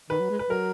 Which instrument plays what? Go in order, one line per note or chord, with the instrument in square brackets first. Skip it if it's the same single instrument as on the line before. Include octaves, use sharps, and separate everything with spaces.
[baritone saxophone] D#3 [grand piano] B4
[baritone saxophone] F#3
G#3
[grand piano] B4
[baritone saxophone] F#3 [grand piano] A#4